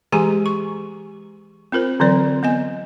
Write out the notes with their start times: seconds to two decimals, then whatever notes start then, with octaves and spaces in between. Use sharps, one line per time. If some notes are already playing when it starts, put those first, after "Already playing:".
0.12 E3 G#3 G4 G#4 G#5 A#5
0.46 C#6
1.72 C4 F4 A#4 C5
2.00 D3 E3 F#3 C4 B4 D5
2.43 B3 D#5 G#5